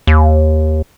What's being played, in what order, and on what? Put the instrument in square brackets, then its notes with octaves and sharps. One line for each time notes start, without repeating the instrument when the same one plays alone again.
[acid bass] D#2